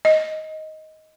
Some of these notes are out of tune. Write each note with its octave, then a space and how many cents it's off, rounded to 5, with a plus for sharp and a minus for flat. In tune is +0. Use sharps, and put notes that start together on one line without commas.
D#5 +10